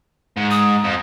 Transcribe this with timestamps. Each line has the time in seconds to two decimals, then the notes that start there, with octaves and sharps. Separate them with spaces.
0.37 G#2
0.51 D#6
0.84 F2